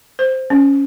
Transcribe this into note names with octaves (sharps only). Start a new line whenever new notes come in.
C5
C#4